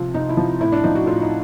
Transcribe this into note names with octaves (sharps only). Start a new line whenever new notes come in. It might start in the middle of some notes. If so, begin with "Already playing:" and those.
Already playing: C3 F3 F4
C3 D#4
E4
F3
A2 E4
D4
F3 D#4
F#4
A2 F4
D#4